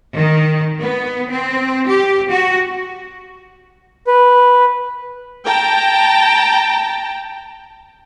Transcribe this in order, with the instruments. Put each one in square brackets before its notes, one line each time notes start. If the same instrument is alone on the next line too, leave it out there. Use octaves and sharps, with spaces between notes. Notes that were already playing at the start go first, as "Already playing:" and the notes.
[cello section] D#3
B3
C4
G4
F#4
[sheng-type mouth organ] B4
[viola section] G5 A5 A#5